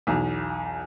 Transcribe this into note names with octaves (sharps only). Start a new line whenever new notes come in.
B1 E2